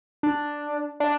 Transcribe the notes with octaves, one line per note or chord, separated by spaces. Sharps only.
D4
D4